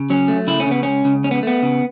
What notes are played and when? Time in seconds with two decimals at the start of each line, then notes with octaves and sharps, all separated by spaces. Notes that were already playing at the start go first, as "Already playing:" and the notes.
Already playing: C#3
0.10 F#3 C#4
0.28 A3
0.47 C#3 E4
0.60 C#4
0.67 C#3 B3
0.83 C#2 C#4
1.05 C#3
1.24 C#2 C#4
1.31 B3
1.43 A3 B3
1.63 C#3